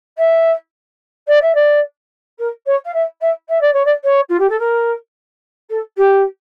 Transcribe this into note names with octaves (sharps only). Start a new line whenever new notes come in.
E5
D5
E5
D5
A#4
C#5
F5
E5
E5
E5
D5
C#5
D5
C#5
F4
G4
A4
A#4
A4
G4